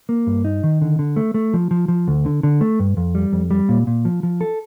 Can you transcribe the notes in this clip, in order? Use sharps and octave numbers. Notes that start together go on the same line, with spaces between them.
A#3
G2
D#4
D#3
D3
D3
A3
A3
F3
F3
F3
D2
D3
D3
A3
G2
F2
G3
F2
G3
A#2
A#2
F3
F3
A4